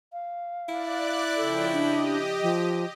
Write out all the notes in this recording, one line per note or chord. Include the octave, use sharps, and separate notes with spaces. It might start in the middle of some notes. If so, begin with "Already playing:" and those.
F5
E4 D5 F#6
C#3 F3 A4 G5
D4 G4 D#5
F3